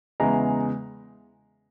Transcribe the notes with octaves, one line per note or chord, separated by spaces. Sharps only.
E2 C#3 E3 G#3 A#5